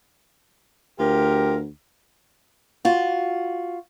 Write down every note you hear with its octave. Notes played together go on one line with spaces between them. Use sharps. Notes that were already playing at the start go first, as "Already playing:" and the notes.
D2 F4 G4 A#4
F4 F#4